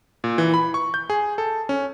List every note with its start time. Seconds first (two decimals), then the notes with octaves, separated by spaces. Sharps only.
0.24 A#2
0.38 E3
0.54 B5
0.74 C#6
0.94 G6
1.10 G#4
1.38 A4
1.69 C#4